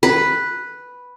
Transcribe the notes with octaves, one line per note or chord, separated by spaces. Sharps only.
B4